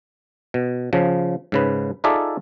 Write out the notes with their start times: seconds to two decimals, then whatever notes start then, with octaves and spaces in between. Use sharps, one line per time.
0.54 B2
0.93 C#3 F3
1.52 G#2 C#3 B4
2.04 D#4 F4 G#4 A4 D5 E5